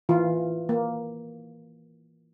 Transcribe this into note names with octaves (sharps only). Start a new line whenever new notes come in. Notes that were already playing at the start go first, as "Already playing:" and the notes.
E3 F4
A#3